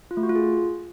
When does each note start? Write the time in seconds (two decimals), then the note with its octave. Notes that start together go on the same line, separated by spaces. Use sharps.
0.11 F4
0.17 A3
0.23 F#4
0.29 F4
0.36 G#4